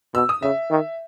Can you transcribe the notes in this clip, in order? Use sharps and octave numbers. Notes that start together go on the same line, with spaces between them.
B2 E6
D#6
C#3 E5
D#3